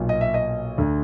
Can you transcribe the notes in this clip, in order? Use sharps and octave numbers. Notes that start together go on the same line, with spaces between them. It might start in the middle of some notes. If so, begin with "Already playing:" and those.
Already playing: B1 A#2
D#5
E5
D#5
D2 D3